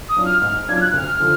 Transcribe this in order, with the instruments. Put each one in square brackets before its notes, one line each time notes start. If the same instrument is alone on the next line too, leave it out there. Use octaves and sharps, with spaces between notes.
[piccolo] D#6
[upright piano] F#3 D4 F4
[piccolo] F6
[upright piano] G#2 [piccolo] F6
[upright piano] F#3 D4 F4 [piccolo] G#6
[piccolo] F6
F#6
[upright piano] D2 [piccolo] F6
[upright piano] D3 F3